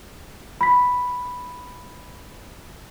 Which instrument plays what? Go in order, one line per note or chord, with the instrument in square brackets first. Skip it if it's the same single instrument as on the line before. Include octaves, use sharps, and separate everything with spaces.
[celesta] B5 B6